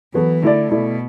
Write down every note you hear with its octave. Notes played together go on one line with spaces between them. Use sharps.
E3 F#3 B3 F#4 A4
D3 A3 E4 D5
B2 A3 E4 D5